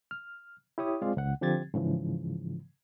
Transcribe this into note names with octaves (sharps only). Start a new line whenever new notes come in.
F6
E4 G4 C#5 D#6
G#3 C4 F4 G#4 D5 F5
C#2 F#5
D3 F3 C4 G4 G#6 A6
G#2 C#3 E3 F3